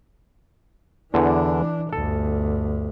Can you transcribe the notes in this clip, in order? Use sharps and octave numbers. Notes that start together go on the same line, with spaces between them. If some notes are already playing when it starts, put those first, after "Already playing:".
E2 D3 E3 D4
G1 D2 A4